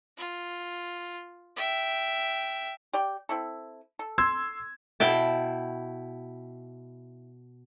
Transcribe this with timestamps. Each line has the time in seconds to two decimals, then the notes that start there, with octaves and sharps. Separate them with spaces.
0.18 F4
1.56 E5 G5
2.93 G4 D5 G5
3.29 C4 E4 A4
3.99 A4
4.18 C6 E6 G#6
5.00 B2 E4 G5 A5